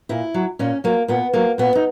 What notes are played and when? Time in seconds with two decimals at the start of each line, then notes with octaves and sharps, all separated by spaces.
0.09 A#2 E4
0.34 F#3
0.59 A#2 C#4
0.84 F#3 A#3
1.08 A#2 B3
1.33 F#3 A#3
1.58 A#2 B3
1.75 D#4